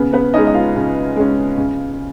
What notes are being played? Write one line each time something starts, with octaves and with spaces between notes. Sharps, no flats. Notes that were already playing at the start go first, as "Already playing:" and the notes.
Already playing: C#3 B3 B4
B3 B4
G#3 C#4 D#4 D#5
D#5
F4 F5
C#3
G#3 C#4
C#3